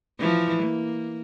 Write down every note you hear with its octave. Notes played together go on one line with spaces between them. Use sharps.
E3 F3
A#3